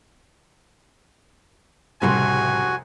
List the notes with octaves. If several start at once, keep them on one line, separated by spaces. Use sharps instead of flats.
F1 C2 A2 C#3 G3 F#4 G#5 C6